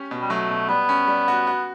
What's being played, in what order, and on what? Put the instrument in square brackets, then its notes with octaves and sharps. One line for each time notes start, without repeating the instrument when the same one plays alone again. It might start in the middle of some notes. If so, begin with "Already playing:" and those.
Already playing: [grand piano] C#4 G4
B2
[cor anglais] G3
[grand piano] F#3 [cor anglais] A3
[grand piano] B2
[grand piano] G3 [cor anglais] B3
[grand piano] C#4
G3
F#4
F#4